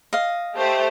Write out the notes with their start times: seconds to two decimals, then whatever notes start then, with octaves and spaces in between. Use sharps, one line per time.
0.13 D#5 F5
0.56 A3 G4 C5